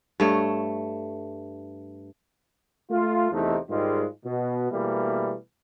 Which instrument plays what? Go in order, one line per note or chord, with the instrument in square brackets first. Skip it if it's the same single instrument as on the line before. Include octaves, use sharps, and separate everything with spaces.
[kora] G2 A3 C#5
[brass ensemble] A3 F4
E2 C3 A3 D#4
G#2 D#3 G3 G#3 F4
B2
B2 E3 G3 A3 A#3